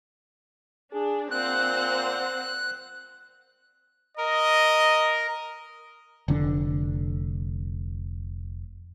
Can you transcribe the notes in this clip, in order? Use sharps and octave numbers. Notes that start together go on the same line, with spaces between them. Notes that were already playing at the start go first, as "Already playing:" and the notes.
D4 G#4
A#2 C4 C5 F#5 F#6
A#4 D#5
F1 D3 D4